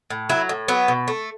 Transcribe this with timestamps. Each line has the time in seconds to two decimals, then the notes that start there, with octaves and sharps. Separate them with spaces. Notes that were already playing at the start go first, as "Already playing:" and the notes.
0.10 A2
0.29 F#3 E4
0.49 A2
0.68 F#3 B3
0.88 B2
1.08 A3